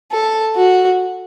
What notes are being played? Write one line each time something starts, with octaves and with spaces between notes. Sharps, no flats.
A4
F#4